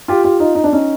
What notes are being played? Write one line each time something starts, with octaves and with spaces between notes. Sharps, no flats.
F4 G4
F4 G4
D#4 F4
D#4
D4
C#4 D#4